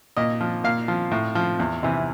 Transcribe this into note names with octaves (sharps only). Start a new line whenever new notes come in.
A#2 D#5
F3
A#2 F5
F3
A2
F3
E2
C3 E3